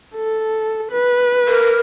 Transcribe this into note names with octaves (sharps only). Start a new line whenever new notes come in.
A4
B4
A#4